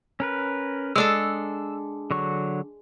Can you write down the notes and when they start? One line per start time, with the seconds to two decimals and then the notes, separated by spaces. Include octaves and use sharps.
0.20 C#4 A#4 B4
0.96 G#3 D4 A4 E6
2.11 D3 F#3 C#6